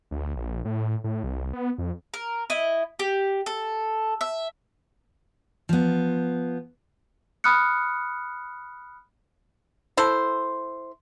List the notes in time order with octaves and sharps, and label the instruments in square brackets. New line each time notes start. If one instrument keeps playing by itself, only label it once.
[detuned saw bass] D2
A#1
A2
A2
C2
B3
F2
[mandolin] A#4
E4 D#5
G4
A4
E5
[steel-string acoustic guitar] F3 B3
[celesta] B5 D#6 F6 F#6 C#7
[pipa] E4 A4 C5